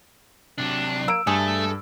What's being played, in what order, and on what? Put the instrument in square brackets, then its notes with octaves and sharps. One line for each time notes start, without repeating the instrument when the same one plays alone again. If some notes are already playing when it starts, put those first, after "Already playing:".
[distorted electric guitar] C3 F#3 [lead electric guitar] D4
[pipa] A#3 [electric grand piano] E6 D7
[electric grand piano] G2 [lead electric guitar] A3 [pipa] G#4 [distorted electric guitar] A4